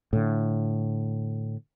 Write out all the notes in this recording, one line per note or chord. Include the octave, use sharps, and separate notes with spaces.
A2 D3